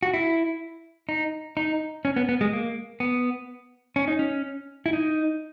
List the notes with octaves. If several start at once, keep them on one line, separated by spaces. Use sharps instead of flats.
F#4
E4
D#4
D#4
C#4
B3
B3
G#3
A#3
B3
C#4
D#4
C#4
E4
D#4